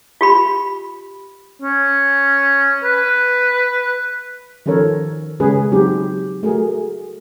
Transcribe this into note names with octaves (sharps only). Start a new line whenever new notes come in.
F4 G4 B5
C#4
B4
D#3 F3 C#4 A4 A#4 C#5
C#3 G#3 C#4 G#4 B4
F#3 C4 D#4 G4
A3 F#4 G#4 A#4